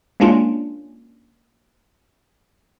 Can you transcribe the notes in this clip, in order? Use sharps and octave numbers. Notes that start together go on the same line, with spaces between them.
G#3 A#3 C#4 D4 F4